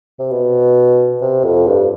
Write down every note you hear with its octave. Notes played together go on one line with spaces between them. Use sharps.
C3
B2
C3
F2
G2